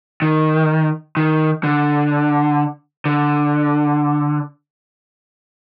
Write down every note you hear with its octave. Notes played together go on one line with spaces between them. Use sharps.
D#3
D#3
D3
D3